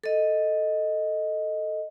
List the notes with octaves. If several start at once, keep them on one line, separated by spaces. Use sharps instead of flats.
A4 D#5